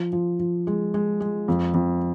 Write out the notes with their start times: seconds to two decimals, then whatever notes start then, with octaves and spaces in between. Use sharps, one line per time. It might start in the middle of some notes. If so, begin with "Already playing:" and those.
Already playing: F3
0.13 F3
0.40 F3
0.67 G#3
0.94 G#3
1.20 G#3
1.48 F2
1.74 F2